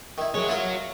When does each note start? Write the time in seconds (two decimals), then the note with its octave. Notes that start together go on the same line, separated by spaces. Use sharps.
0.18 D#3 E4
0.35 G#3 F#4 C#5
0.48 E4 F4 A#4